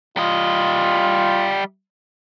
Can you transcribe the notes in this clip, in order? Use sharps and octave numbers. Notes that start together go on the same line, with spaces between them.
G3 F4 D#5